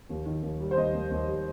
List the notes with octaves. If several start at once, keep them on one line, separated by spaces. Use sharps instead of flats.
D#2
D#3
D#2
G3
C5
D#2 D#5
D#2
D#2
G3